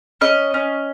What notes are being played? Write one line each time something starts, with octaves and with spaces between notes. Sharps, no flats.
C#4 D#5
C#4